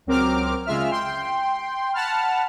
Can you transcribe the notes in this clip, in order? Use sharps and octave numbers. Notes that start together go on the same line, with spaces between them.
C#2 F#3 C4 A#4 D6 F6
C#3 G#3 F4 E5 F6
G5 C6
F#5 A5 B5 F6